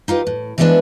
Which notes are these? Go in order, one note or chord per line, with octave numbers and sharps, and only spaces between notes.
D#4 F4 G4 B4
A2
E3 F3 G#3 B3 D4 E4